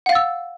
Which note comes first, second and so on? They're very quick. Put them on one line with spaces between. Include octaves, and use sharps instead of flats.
F#5 F5 A6 E6